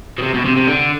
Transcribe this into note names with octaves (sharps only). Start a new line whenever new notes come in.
B2
C3
B2
C3
C3
D3